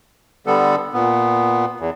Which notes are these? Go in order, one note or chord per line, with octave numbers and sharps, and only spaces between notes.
D3 G3 B3 A4
A#2 B3
E2